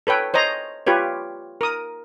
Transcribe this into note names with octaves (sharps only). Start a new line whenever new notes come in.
A4 B4 C#5 G5
C5 C#5 D#5 A#5
F4 G4 B4 C#5
A#4 D#6